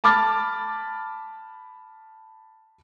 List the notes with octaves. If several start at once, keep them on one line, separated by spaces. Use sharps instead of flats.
A5 B5 D6 F6 A6